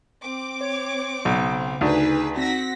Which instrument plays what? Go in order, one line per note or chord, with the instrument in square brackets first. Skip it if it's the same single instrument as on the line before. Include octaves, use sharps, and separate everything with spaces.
[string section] C4 D6
[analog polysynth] C#5
[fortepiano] B1 [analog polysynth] C#3
[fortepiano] D2 [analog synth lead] D#4 [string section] G#4 B4
[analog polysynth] C4 F#4 F#5 [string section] A#6 B6